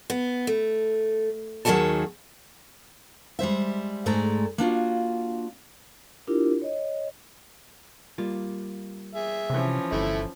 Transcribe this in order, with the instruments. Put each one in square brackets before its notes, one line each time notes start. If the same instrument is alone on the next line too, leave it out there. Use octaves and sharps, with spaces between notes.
[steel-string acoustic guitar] B3
A3
D#2 D#3 F#3 G#4 C#5 A5
G3 G#3 C5 E5
G#2 G#3 A3 A4 D5 A#5
A#3 D4 F4 F#4
[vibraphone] D4 E4 F4 G4 A#4
C#5 D#5
[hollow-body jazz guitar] G3 A#3 F4
[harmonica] G#4 E5
[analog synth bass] C3 [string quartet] E3 F3 C#4
[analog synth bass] G1 [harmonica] A3 E4